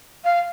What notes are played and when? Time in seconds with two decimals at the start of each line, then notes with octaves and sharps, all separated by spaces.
0.24 F5